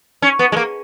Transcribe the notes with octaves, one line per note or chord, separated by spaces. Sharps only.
C#4
B3
G#3
A#3